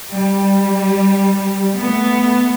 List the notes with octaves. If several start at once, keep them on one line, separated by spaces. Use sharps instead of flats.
G3
A3 B3